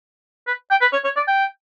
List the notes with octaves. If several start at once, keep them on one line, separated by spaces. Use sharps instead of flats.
B4
G5
B4
C#5
C#5
D5
G5